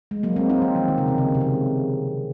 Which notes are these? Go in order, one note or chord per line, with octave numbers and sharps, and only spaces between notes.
G#3
F#3 A#3
G#3 C4
C4 D#4
F3
D#3
D#3
C#3
C3
C#3
C3
C#3